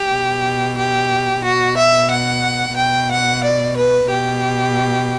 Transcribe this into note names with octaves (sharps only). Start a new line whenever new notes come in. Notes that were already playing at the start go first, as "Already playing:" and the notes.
Already playing: G4
B2
G4
B2 F#4
E5
F#5
B2 G5
F#5
D5
B4
B2 G4